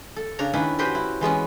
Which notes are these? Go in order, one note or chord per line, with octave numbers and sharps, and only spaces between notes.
A4
C#3 D4 C#5 A#5
D#3 C#4 D4 E4 B4
C#4 F#4 G4 B4 C5 G5
E4
E3 G#3 B3 C#4